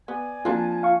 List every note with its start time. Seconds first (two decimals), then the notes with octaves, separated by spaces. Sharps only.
0.08 B3 D5 G#5
0.45 F3 A#3 C4 D4 A5
0.83 F5 C#6